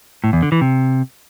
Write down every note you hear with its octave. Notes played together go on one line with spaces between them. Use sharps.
A2
E2
D3
E3
C3